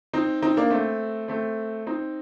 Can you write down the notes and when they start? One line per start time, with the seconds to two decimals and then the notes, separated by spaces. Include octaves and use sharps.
0.14 C4 D#4
0.42 C4 D#4
0.57 A#3 D4
0.71 A3 C4
1.28 A3 C4
1.87 C4 D#4